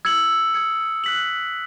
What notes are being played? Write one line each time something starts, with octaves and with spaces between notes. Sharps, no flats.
E6 G#6 C#7 F#7
D#6 G#6 C#7
F#6 B6 F#7